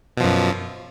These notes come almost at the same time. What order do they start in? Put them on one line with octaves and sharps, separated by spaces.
B2 F3 F#2